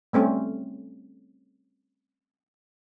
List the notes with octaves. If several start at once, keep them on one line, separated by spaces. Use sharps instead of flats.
G3 A3 C4 C#4